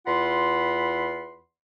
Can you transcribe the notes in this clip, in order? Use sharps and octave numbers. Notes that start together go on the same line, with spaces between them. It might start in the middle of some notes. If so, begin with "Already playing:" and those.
E2 F4 F#5 B5 C6